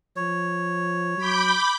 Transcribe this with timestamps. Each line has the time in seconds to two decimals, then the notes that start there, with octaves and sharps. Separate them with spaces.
0.16 F3 C#5
1.17 F#3 B5 D6 G6